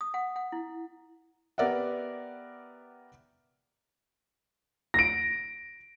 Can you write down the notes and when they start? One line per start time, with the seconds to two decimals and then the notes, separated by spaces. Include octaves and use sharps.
0.01 D#6
0.14 F#5
0.36 F#5
0.52 E4
1.58 B3 G4 A#4 D5 E5 F#5
4.94 A#6 D7